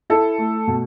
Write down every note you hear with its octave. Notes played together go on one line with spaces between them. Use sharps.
E4 A4
A3
B2